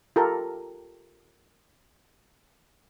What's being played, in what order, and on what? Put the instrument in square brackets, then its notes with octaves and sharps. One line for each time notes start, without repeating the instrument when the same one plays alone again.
[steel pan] F4 G4 A4 A#4